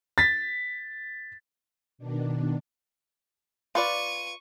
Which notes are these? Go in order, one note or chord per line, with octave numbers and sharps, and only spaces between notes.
A6 B6
B2 D#3 D4
F4 B4 D5 C#6 D#7